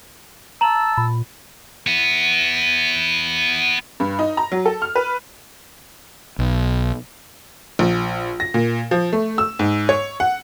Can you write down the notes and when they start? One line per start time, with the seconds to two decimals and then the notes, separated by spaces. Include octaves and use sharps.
0.61 A5 A#5 E6 E7 F#7
0.97 A#2 B5
1.87 B3 E4
4.00 G2
4.19 D#4
4.37 A#5
4.52 F#3
4.66 A4
4.82 F6
4.96 B4
6.39 B1
7.79 A#1
8.40 A#6
8.54 A#2
8.91 F3
9.13 A3
9.38 E6
9.59 G#2
9.89 C#5
10.20 F#5